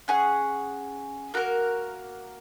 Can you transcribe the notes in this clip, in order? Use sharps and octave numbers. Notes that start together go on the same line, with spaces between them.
C#4 G#4 F#5
A#3 F#4 A#4